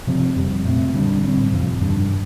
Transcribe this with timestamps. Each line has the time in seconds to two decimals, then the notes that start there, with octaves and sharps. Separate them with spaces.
0.07 C3 F3 C4
0.36 F2 C3 G3
0.65 A#2 A3 C4
0.94 D3 G3 D4
1.23 A2 G3 C4
1.52 F2 C3 F3
1.81 G2 D#3 G3 D4